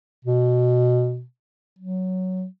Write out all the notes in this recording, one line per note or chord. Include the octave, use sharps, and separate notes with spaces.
B2
F#3